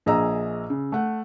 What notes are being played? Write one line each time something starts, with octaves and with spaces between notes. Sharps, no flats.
A#1 G#4 D#5 A#5 E6
C#3
A3 F#5